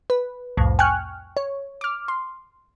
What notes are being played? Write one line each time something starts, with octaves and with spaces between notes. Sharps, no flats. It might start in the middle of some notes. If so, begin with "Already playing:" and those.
B4
C2 F2 A2
G5 G#5 C#6 F6 F#6
C#5
D6 F6
C6